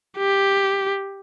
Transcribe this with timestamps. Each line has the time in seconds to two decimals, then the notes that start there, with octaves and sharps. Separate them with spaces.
0.18 G4